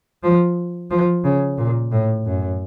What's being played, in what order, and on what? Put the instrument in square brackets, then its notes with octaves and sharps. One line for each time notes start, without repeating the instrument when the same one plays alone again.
[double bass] F3
F3
C#3
A#2
A2
F#2